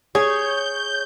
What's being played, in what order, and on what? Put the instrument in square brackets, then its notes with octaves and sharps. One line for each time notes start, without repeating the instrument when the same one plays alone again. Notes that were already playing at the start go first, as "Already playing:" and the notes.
[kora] G#4 [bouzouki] C#5 [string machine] G6